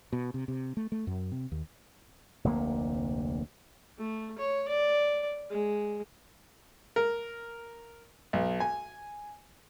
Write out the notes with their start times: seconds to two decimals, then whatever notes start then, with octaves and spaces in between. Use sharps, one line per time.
0.13 B2
0.34 C3
0.48 C3
0.77 A3
0.92 A3
1.07 F#2
1.32 C3
1.52 D#2
2.44 F1 D2 C3 A#3
3.98 A3
4.38 C#5
4.68 D5
5.50 G#3
6.96 A#4
8.33 B1
8.60 G#5